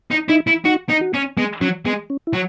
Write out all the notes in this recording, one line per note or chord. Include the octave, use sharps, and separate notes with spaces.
D#4
D#4 E4
E4
D#4 F#4
D#4
F#4
C#4
G#3 B3
F#3 C#4
G#3 B3
C#4
E4
F#3